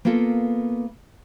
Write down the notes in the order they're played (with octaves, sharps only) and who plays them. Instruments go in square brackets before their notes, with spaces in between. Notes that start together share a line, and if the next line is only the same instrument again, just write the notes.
[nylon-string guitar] A#3 B3 F4 A4 A#4